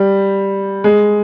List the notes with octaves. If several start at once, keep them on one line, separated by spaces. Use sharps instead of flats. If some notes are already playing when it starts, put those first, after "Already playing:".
Already playing: G3
G#3